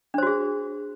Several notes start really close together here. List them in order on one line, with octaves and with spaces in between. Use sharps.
D4 C5 F#4 G#4